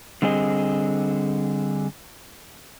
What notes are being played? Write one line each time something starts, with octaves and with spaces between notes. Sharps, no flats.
D3 G3 C4 G#4 D#5